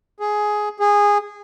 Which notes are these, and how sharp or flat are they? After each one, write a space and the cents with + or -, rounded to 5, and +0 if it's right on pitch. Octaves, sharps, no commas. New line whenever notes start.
G#4 +10
G#4 -15